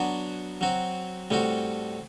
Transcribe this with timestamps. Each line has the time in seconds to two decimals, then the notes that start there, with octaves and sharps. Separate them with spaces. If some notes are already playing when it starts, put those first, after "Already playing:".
Already playing: F#3 B3 D4 F#4
0.61 F#3 C4 F#4
1.30 A2 G3 C4 F#4